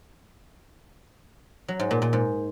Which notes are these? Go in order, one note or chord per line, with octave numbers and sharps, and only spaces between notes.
F#3
G#2
A#2
A#2
G#2